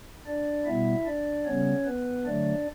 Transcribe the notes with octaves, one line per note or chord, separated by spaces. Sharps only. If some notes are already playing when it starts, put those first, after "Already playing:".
D4 D5
B2 G3 B3 E4 E5
D4 D5
C#3 G3 B3 C#4 C#5
B3 B4
D3 F#3 A3 D4 D5